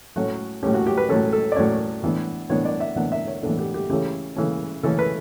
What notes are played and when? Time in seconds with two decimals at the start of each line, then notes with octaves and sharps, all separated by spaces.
0.16 A2 F#3 A3 C#4 F#4
0.63 A2 F#3 A3 C#4 G4
0.74 F#4
0.87 G4
0.97 B4
1.09 A2 F#3 A3 C#4 A4
1.33 A4
1.52 D5
1.56 A2 F#3 A3 C#4 C#5
2.03 A2 E3 B3 D4
2.49 A2 E3 B3 D4 C#5
2.65 D5
2.80 E5
2.96 A2 E3 B3 D4 F#5
3.12 E5
3.27 C#5
3.43 A2 E3 B3 D4 A4
3.59 G4
3.74 G4
3.89 C#3 E3 A3 C#4 G4
4.36 C#3 E3 A3 C#4
4.83 C#3 E3 A3 C#4 A4
4.99 B4